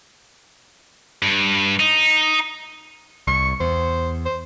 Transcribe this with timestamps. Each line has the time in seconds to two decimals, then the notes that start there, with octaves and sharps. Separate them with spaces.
1.23 G2
1.80 D#4
3.27 C2 C#6
3.60 E2 C5
4.25 C5